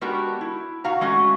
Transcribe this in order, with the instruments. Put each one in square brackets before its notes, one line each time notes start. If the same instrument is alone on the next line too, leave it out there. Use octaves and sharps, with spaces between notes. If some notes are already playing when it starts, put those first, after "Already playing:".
[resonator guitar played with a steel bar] G#3 B3 D4 F#4 G4 A#4
E4
B2 F#4 F5 A#5
G#3 A3 C#4 F#4